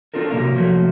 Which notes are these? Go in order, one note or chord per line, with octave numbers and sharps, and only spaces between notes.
C4 D4 F4 A4 A#4
C3 F#3 A#3 A#4 F5
C3 F3 F#3 A3 A#3